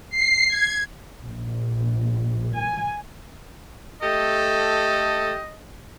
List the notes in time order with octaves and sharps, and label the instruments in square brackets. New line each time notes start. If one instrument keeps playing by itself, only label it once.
[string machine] C7
G#6
[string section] A#1
G#5
[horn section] A3 G4 A4 [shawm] D#5